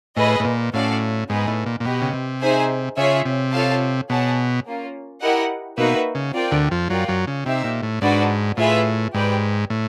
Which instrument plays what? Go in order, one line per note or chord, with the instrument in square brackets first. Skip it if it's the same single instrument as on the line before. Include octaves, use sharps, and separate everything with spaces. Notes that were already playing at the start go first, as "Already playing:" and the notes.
[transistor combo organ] A2 [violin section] G#4 B4 D#5
[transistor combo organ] A2
A#2
[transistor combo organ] A2 [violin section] C#4 F#4 A4 D5 F5
[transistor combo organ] G#2 [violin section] B3 D#4 G#4 B4 D#5
[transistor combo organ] A2
A#2
A#2
[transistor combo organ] B2 [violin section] G4 B4 D#5
[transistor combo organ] C#3
C3
[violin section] D#4 G#4 C5 E5 G#5
[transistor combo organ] C#3 [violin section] F4 G#4 C#5 E5
[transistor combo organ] C3
[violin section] F4 A4 C#5 F5 A5
[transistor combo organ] B2 [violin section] G#4 C#5 F#5 A5
[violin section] A#3 C#4 F4
E4 G4 A#4 D#5 F#5
[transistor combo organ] B2 [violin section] A#3 D#4 F#4 B4 E5
[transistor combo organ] C#3
[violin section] C4 F4 A#4 D5 G5
[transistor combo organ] D2 D3
F2 F3
[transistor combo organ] F#2 F#3 [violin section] F4 A#4 D5 G5
[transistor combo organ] F#2 F#3
C#3
[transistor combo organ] C3 [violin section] D#4 G4 C5 E5
[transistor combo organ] A#2
A2
[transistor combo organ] G#2 [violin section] D4 F#4 B4 D5
[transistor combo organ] A2 [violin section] F4 G#4 B4 E5
[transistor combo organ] G#2 [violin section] G4 B4 D5 G5
[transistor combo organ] A2